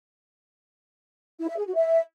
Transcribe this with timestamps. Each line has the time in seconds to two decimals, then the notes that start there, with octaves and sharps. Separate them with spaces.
1.40 E4
1.49 E5
1.58 G#4
1.67 F#4
1.75 E5